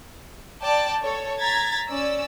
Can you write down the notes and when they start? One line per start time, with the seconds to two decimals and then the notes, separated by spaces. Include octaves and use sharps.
0.62 D5 G5 A5
1.02 A4 C#5
1.39 A#5 G#6 A6 B6
1.89 C#4 D5 E6